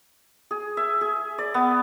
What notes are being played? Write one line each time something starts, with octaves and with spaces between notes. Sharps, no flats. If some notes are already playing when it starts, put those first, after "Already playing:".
G#4
E5
G#4
D5
B3